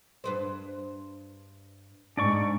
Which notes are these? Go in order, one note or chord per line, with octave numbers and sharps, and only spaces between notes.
G2 B4 C5
G#2 D4 D5 C#6